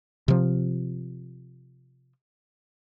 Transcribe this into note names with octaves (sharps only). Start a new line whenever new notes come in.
C3 F3